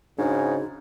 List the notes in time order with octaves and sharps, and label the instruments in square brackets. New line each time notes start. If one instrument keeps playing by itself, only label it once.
[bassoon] G#2 [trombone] C#3 [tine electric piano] D4 F#4 G#4 [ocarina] D#4